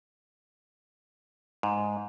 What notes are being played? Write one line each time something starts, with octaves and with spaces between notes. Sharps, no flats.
G#2